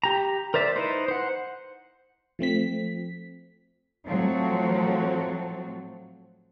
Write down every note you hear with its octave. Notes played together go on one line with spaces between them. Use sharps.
G4 A#5
A#4 C5 D5 E5
D#4 E4 B4 C5
C5 F#5
F3 A3 C4 B6
A2 F3 F#3 A3 C4 A4